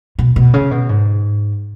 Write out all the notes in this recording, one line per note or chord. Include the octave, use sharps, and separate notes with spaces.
B2
B2
C#3
B2
G#2